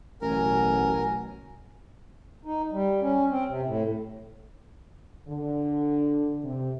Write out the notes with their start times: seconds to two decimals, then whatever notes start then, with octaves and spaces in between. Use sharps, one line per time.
0.22 A1 B2 F#3 A#4 G#5
2.45 D#4
2.71 G3
3.02 C#4
3.30 C4
3.49 C3
3.66 A2
5.29 D3
6.44 C3